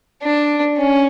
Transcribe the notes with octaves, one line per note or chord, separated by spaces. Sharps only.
D4
C#4